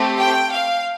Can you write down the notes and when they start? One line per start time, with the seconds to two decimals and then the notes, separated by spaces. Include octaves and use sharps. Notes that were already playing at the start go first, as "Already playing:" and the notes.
Already playing: A3 C4 G4
0.17 G5
0.51 F5